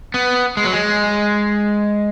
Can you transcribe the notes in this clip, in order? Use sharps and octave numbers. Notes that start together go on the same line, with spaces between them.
B3
G#3
F#3
G#3